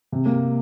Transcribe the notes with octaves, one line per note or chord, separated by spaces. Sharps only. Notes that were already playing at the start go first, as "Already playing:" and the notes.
C3
A#3